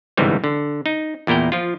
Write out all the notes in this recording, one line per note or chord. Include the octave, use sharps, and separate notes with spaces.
G1 C#2 G#2 C3 E3 G3
D3
D#4
E2 A#2 E4 A#4 G5
F3 F4